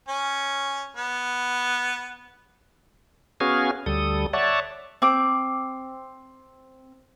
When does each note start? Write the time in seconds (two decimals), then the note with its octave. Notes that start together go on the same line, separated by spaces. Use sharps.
0.08 C#4
0.97 B3
3.40 B3 C#4 F#4 G#4 F5 G#5
3.86 D2 G3 A4 D#6
4.33 C#5 D5 E5 F#5 A5
5.02 C4 D6